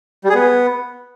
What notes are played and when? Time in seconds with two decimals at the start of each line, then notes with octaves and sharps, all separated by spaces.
0.24 G3
0.29 G#4
0.34 B3